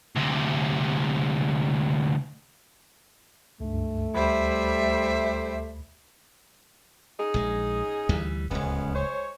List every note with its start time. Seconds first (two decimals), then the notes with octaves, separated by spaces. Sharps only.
0.16 D2 C3
3.60 C#2 G2 A3
4.15 D2 G3 C5 E5 B5
7.20 C#4 D#4 G#4
7.34 A#1 G#3
8.09 D2 E3 G3
8.51 D1 C#2 G#3 B3 C#4
8.95 G#3 C5 C#5